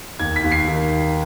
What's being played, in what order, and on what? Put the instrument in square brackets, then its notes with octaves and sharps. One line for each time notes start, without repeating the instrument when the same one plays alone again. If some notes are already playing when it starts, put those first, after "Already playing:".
[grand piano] D#2 G#6
B6
D#2
C7
D#3